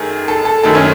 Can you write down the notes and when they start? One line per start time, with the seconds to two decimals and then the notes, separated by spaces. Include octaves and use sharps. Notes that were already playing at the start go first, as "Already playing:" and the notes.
Already playing: F#2 D#3 A3 G#4
0.28 A4
0.45 A4
0.63 F#2 D#3 A3 A4
0.75 C#4